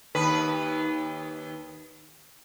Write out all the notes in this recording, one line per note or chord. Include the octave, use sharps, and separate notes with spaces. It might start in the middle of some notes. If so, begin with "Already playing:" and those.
D#2 B4